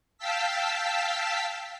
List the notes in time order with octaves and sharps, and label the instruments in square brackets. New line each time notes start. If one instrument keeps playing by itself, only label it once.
[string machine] F5 G5 A5 E6 B6